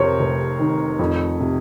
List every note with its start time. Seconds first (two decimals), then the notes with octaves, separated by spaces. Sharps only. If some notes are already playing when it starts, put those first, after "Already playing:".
Already playing: F2 C3 A#4 C5 C#5
0.19 F1
0.59 D#3
0.99 F2
1.40 C3